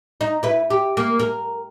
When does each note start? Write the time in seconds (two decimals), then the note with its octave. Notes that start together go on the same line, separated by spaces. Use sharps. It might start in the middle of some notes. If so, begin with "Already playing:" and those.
0.21 D#4
0.43 E4 B4
0.70 G4
0.97 A#3
1.19 A#4